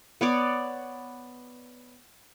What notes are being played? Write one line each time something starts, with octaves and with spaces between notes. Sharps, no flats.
B3 C#5 D5